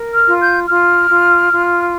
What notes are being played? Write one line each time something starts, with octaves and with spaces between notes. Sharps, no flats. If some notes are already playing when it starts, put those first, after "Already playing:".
Already playing: A#4
F6
F4
G6
F4 F6
F4
F4